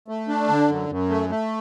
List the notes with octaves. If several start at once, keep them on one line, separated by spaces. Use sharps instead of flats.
A3
D4
D3
F#2
F#2
A3
A3